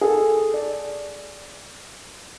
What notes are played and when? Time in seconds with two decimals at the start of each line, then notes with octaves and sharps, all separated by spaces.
0.01 G#4 A4
0.54 D5